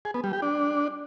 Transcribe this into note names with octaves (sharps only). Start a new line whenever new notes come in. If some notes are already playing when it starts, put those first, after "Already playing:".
G#4
B3
G3
G4
D4